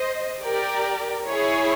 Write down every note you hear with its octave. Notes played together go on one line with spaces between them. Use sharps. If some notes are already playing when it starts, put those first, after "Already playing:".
Already playing: C5 D#5
G4 A#4 D5
E4 G#4 C#5